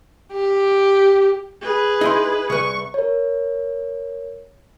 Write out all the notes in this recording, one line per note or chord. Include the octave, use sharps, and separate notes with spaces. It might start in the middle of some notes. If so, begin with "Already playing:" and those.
G4
G#4 B4
D#4 E4 C6
C2 B4 C#6
A#4 C#5